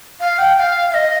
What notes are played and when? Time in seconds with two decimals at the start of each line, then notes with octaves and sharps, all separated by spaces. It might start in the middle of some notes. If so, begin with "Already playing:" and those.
0.20 F5
0.39 G5
0.55 G5
0.60 F5
0.91 F5
0.94 D#5